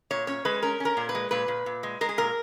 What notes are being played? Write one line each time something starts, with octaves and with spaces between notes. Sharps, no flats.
A#2 C#5
C#4 C#5
G#3 B4
C#4 A#4
C#4 A#4
A#2
B4
G#3
A#2 B4
A#2
A#2
G#3
G#3 A#4
G#4
A#2 A#4